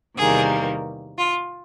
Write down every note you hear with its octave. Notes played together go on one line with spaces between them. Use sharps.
E2 C3 D#3 G3 A#3 G#4
F4